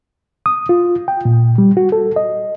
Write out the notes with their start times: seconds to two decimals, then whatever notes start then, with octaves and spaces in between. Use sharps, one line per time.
0.46 D#6
0.69 F4
1.08 G5
1.25 A#2
1.58 G3
1.77 F#4
1.92 A4
2.16 D#5